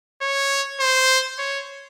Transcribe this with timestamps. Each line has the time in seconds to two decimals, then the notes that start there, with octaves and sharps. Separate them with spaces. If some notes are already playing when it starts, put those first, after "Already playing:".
0.22 C#5
0.80 C5
1.39 C#5